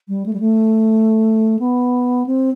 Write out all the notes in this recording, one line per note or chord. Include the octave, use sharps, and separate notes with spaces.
G3
A3
G3
A3
B3
C4